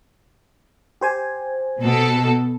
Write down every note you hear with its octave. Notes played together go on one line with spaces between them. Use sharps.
G4 C5 G#5
B2 A4